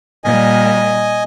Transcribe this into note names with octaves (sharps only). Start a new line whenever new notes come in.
A#2 G3 D#5 G#5